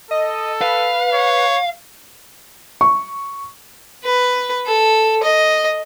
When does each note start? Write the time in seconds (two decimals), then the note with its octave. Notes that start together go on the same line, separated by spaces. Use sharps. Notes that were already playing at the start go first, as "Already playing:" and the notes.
0.11 A4 D#5
0.61 B4 F5
1.13 C#5
2.81 C#6
4.04 B4
4.66 A4
5.23 D#5